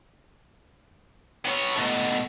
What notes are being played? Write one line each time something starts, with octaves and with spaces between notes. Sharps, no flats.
B3 C#5
B2 A3